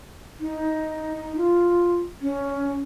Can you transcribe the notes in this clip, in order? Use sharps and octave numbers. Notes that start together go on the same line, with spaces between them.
D#4
F4
C#4